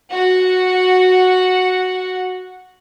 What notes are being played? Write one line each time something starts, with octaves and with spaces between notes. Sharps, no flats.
F#4 F#5